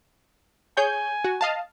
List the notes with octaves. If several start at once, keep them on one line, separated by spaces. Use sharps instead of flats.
G#4 C#5 G#5 G6
F#4
D#5 F5 A5